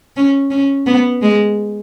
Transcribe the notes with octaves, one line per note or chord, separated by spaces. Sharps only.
C#4
C#4
B3
G#3